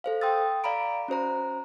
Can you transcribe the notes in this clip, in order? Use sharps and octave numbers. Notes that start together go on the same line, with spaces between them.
A4 C5 F5
G5 C6 D#6 E6 A6
D5 F5 A#5 B5 D7
C#4 F#4 C5 A#5